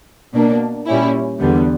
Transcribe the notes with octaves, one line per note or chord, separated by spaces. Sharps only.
B2 A#3 D4
A#2 G3 C#4 E4
E2 D3 G3 B3